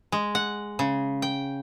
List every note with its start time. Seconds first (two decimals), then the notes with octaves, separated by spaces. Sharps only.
0.12 G#3
0.35 F#5
0.79 C#3
1.22 G5